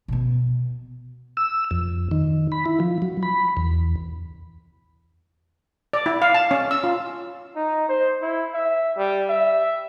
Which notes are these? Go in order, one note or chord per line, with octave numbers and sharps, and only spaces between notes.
B2 B3
E6
F2
D#3
B5
E4
F3
F#3
B5
E2
D5
E4
F5
A5
C#4
E6
F4
D#4
C5
E4
E5
G3
E5